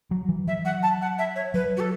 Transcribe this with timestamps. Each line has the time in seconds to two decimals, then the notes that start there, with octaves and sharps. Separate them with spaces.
0.11 F#3
0.29 E3
0.47 F#3 E5
0.64 F#5
0.82 A5
1.01 F#5
1.18 E5
1.35 C#5
1.54 F#3 B4
1.76 F#4
1.80 A4